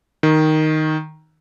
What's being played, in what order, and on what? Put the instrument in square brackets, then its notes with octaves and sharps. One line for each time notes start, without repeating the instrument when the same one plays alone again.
[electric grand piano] D#3